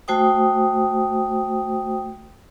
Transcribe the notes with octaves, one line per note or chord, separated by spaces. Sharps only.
A3 F#4 C5 G5 D#6